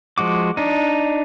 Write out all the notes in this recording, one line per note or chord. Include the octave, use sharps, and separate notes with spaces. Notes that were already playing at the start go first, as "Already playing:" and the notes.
F3 G#3 F#4 D6
D4 D#4